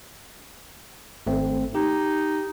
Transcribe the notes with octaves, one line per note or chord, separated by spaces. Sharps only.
G#1 A3 C4
D#4 G4